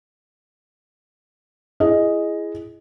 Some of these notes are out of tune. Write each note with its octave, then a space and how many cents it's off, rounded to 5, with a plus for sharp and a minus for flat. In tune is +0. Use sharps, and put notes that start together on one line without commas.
E4 +25 G#4 +0 D#5 +0